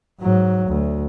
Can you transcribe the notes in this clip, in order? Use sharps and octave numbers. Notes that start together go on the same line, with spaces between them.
G#2 F#3
D2